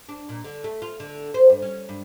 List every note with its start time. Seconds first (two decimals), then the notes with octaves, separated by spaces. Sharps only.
0.09 D4
0.29 A#2
0.44 D3
0.64 A3
0.82 F4
1.00 D3
1.34 C5
1.50 G2
1.62 C#4
1.89 G2